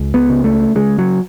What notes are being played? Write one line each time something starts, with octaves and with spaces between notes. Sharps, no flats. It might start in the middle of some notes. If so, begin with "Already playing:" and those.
Already playing: C#2
B3
C#3
A3
C#3 G#3
F#3